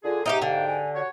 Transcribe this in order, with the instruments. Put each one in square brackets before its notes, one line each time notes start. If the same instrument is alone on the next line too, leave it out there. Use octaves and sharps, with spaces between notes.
[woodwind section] D3 G#4 [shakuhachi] F4
[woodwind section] G#2 G5 [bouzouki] D#4 F4 G4 [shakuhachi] E5
[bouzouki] D3 [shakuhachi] F5
[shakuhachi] G#5
[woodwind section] F#4 C#5 [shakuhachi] F#5